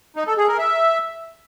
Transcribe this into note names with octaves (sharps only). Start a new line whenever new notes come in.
D#4
A4
G#4
A#4
E5